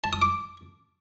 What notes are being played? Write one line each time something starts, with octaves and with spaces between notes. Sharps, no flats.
A5
D#6
D6